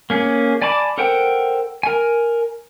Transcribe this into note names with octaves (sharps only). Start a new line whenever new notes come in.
A#3 C#4 G#4
D5 G#5 A5 B5 D6
A4 A#4 C5 F#5 G5
A#4 G#5